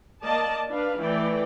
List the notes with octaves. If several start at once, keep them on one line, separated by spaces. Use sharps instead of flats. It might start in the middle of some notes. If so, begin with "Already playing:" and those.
A#3 D5 D#5 A5
D4 B4 F5
E3 A3 D5 G5